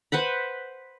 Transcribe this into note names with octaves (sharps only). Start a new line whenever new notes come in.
B4 C5 F#5 B5